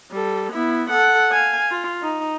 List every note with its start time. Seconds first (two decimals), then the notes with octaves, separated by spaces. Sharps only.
0.11 G3 A4
0.53 B3 E4
0.90 A4 F#5
1.32 F5 G#5
1.71 F4
2.02 D#4